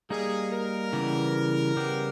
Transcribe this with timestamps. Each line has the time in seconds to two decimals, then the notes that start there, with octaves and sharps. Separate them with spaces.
0.10 G3 A#3 D#4 G#4
0.52 A#4
0.93 C#3 E3 G3 B3 G4
1.76 C#3 G3 B3 G4